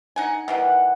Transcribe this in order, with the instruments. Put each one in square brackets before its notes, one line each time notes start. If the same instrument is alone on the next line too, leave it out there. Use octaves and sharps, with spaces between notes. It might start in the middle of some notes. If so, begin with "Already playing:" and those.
[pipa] D#4 F#5 G#5
[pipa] D#3 E3 G3 [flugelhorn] F#5